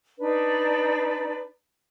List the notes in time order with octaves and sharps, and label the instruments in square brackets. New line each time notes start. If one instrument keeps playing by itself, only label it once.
[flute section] D4 D#4 B4 D5